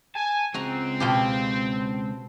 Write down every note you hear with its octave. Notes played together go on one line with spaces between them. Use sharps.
G#5 A5
C#2 G#3 C4 F#4 A#5
B2 F4 G4 G5 A5 B5